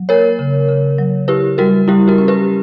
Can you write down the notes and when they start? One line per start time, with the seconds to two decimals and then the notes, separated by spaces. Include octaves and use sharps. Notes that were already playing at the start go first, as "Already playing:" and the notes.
Already playing: F#3
0.09 A#3 A#4 C#5
0.39 C#3
0.69 C#3
0.99 F#3
1.28 E4 G4 B4
1.58 G3 F#4 A#4
1.88 G3 E4 G4
2.08 F#4 A#4
2.18 C#4
2.28 G4 B4